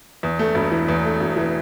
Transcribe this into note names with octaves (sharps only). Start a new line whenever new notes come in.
E2
A3
E1
E3
E2
A3
E1
E3